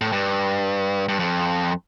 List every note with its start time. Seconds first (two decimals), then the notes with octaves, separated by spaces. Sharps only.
0.01 A2
0.13 G2
1.09 G2
1.19 F2